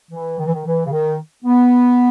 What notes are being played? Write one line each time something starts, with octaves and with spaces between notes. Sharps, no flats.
E3
D#3
E3
D#3
E3
C#3
D#3
B3